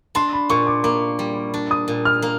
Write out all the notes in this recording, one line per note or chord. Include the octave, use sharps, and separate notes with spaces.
D4 C6
B5
A#2 C#6
D6
A#3 D6
G3
D4
D#6
A#2
F6
A#3